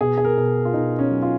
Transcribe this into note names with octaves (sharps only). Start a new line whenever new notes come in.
B2 G#4
G#4
A#4
B2
F4
B2 D#4
C#4
F#3
F4